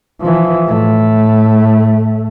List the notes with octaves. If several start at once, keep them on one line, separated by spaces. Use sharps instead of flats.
E3 F3
A2 A3